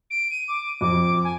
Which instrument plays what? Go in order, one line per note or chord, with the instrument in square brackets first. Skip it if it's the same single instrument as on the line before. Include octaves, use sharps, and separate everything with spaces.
[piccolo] D7
D#7
D6
[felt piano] F2 [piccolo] D6
[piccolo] G#5